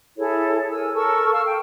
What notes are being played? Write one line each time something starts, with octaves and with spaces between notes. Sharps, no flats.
E4 G#4 A4 C#5
A#4 C#5 G#5 E6
A4 A#4 C#6 E6
F5 E6 F6
G5